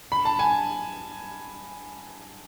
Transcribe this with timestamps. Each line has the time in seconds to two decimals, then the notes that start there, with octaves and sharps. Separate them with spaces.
0.12 B5
0.25 A5
0.39 G#5